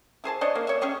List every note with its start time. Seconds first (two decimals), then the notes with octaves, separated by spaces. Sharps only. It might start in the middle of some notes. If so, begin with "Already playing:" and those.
0.24 E4 G#4 C5 A5
0.41 D4 C5 C#5 D#5
0.55 A#3
0.67 C#5 E5
0.81 C#4 G4 G#4 C#5